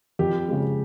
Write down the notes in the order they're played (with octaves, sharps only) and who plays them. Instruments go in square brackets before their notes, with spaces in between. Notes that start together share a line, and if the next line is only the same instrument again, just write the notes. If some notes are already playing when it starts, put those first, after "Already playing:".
[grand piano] F2 G4
C#3 G#3